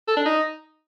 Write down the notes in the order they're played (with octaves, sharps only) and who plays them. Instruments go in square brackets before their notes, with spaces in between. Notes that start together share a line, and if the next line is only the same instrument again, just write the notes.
[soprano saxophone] A4
D4
D#4